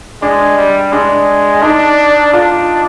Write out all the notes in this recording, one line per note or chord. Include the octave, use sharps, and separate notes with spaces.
G#3 D4
G3
G#3 D4
D4 D#4
D4 F4